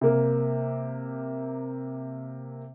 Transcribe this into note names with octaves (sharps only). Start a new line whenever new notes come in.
C3 A#3